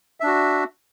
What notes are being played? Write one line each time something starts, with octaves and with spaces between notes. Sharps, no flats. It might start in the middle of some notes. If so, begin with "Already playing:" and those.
D4 F#4 E5